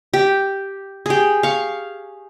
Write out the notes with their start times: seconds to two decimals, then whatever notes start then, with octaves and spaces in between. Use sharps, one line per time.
0.14 G4
1.06 G4 G#4
1.43 F5 C#6